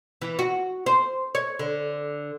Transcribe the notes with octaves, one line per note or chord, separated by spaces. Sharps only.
E3
F#4
C5
C#5
D3